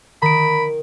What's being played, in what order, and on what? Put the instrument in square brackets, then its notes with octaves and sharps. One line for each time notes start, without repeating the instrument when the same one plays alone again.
[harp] D#3 [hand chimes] A#5 D7 [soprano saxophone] B5